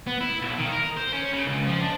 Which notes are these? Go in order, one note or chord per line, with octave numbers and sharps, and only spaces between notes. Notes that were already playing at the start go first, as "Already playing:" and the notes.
B3
E4
B1
D#3
A#4
C5
C#4
C#3
C#2
F3
D4